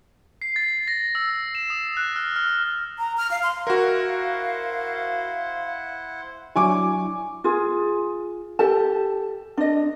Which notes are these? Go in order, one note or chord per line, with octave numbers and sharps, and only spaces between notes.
C7
A6
A#6
E6
E7
D#6
F#6
F6
F6
A#5
F6
F5
C6
E4 F#4 A#4 C5 F5 F#5
F#3 D4 E4 G#5 C#6 D6
F4 G#4
G4 A4 A5
D4 D#5